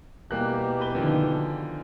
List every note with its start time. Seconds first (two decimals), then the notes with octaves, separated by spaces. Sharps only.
0.31 B2 E3 G3 A#3 G4 F#6
0.81 B4 G7
0.95 D3 D#3 F3